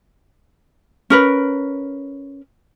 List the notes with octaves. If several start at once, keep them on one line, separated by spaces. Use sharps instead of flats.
C#4 A#4 B4